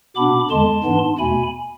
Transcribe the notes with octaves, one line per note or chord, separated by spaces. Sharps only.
B2 B3 D4 B5 D6
E2 D3 G#3 A5 C6
G#2 E3 B3 D4
E2 B2 A3 G#5 B5